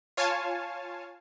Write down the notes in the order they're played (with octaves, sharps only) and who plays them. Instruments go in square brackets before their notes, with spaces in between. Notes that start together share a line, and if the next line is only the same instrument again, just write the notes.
[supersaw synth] F4 C#5 F5 G#5 A5